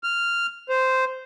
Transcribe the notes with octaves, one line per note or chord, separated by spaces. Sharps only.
F6
C5